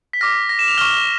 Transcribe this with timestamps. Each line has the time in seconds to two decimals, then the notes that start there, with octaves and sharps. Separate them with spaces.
0.13 B6
0.21 D6 F6 A#6
0.49 A#6
0.59 E7
0.68 F7
0.78 C#6 F6 G7